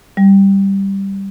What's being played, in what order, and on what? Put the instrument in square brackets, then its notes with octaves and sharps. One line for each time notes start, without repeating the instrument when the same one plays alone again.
[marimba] G3